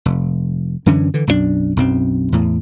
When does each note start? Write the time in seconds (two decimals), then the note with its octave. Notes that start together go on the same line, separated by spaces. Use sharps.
0.06 F1
0.86 F#2 D3 E3 C#4
1.14 D3 E3
1.27 B1 F#2 D#3 D4
1.77 B1 F#2 C4
2.32 E2 A2